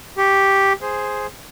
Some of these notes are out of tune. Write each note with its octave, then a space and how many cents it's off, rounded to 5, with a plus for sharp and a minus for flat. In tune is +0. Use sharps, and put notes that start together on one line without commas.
G4 +0 C#6 +0
G#4 +0 C5 +0